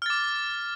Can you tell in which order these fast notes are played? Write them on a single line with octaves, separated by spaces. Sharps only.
F6 A6 D6